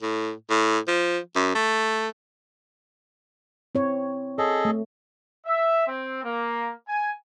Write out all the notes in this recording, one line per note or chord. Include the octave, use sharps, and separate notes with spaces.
A2
A2
F3
F#2
A3
C4 E4 C#5
G#4 A4 C#5 D#5
A3
E5
C4
A#3
G#5